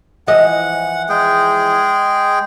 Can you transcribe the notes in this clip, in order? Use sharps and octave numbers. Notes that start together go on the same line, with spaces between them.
E3 F3 D#5 F#5
G#3 G#4 G5